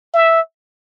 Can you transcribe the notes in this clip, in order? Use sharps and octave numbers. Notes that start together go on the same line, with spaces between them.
E5